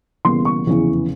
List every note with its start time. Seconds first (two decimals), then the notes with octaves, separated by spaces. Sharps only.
0.25 E1 E2 C#3 G3 A#3 C6
0.45 C#6
0.66 F1 E2 C#3 E3